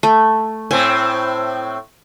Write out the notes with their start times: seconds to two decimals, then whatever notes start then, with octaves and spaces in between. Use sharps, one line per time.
0.03 A3
0.71 A2 C4 G#5